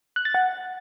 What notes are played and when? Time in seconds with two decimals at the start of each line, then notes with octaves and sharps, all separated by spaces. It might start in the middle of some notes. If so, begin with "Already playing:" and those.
0.16 F#6
0.25 A6
0.34 F#5